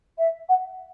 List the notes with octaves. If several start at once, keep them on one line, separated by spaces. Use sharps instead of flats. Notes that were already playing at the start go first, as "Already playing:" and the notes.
E5
F#5